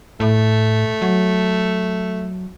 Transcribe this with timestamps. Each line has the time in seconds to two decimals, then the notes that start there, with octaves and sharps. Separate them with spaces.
0.20 A2 A3
1.02 F#3